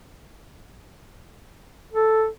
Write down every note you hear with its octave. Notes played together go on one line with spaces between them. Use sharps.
A4